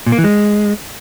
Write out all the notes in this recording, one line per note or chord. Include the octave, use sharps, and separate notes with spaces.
A#2
A#3
E3
G#3